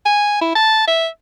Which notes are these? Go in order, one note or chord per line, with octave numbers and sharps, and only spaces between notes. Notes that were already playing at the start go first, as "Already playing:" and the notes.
G#5
E4
A5
E5